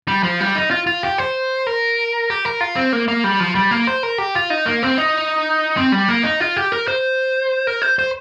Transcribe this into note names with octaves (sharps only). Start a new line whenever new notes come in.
G3
F3
G3
D#4
F4
F4
G4
C5
A#4
G4
A#4
F4
C4
A#3
A#3
G3
F3
G3
A#3
C5
A#4
G4
F4
D#4
A#3
C4
D#4
C4
G3
A#3
D#4
F4
G4
A#4
C5
A#4
C5
C5